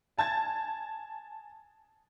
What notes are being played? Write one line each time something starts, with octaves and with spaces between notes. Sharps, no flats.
G#5 A5 G#6 A6